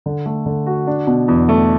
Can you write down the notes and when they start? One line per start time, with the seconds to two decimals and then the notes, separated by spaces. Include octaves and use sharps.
0.06 D3
0.26 A3
0.46 D3
0.67 F#4
0.87 D4
1.07 B2
1.28 E2
1.49 A3